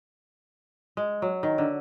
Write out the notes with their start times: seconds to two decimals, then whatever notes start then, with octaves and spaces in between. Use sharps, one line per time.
0.97 G#3
1.22 F#3
1.43 D#3
1.58 D3